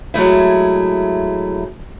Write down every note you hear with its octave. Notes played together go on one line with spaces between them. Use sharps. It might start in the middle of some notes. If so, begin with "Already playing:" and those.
F#3 G#3 A3 E4